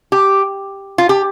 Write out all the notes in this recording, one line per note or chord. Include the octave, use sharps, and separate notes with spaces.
G4
F4
G4